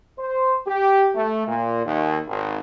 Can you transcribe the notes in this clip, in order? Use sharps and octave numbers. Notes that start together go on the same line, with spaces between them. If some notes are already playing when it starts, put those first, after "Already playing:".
C5
G4
A3
A#2
D#2
G#1